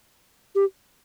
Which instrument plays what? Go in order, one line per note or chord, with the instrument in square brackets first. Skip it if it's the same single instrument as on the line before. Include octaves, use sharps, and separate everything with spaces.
[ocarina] G4